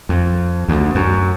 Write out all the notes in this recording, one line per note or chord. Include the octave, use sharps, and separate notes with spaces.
F2
D2
F#2